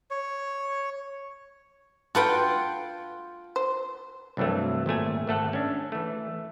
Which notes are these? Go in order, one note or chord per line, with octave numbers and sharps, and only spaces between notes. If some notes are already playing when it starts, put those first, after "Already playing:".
C#5
F4 F#4 A4 B4 F#5 G5
C5
C2 G2 E3 F#3 A3
G#1 A#2 A3 G#5
G#1 A3 A4 F#5
C#4 D4
E3 A3